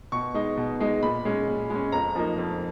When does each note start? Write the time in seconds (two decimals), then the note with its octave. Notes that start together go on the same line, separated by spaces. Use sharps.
0.12 B2 C#6
0.34 G#3 D#4
0.57 B2
0.81 G#3 D#4
1.02 A#2 B5
1.25 G#3 C#4
1.48 A#2
1.70 G#3 C#4
1.92 F2 A#5
2.15 F3 A#3 D#4
2.38 F2